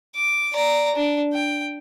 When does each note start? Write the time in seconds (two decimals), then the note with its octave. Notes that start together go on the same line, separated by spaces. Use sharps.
0.15 D6
0.53 D5 A#5
0.95 D4
1.33 G5